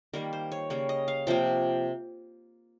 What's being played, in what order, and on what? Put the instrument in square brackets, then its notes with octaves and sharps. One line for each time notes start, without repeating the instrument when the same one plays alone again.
[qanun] D#3 G3 A#3 A#4
C5
C#5
C#3 G3 A#3 C#5
D#5
F5
C3 F3 A#3 G5